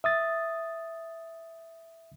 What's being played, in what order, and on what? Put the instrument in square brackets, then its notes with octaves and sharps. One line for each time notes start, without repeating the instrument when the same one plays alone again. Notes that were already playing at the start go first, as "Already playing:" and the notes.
[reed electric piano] E5 D#6 A6